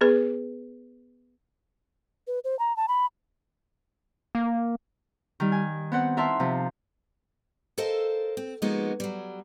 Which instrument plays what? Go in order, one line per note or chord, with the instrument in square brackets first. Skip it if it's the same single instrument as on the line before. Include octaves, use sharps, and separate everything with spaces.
[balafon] B3 G#4 B4
[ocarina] B4
C5
A#5
A5
B5
[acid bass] A#3
[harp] D#3 G3
G#5
B3 C4 F#5
E4 A#4 E5 A5 C6
C3 F3
[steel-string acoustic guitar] A4 A#4 C5 D#5 F5 A5
C4
F3 G#3 A#3 B3 D#4 F#4
F#3 G3